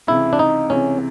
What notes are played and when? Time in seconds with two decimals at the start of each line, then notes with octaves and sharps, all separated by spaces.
0.07 C#2 C3 E3 E4
0.33 D4
0.39 D#4
0.70 C#2 C3 E3 C#4